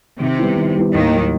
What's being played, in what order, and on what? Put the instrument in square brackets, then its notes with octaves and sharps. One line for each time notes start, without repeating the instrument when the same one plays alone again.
[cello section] C3 [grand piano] D#3
[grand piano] G3 B3 E4
D#3
G3 B3 E4
[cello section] D#2 D#3 [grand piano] A2
[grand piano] F#3 A#3 D#4